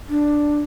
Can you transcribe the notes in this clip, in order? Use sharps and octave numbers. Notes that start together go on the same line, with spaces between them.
D4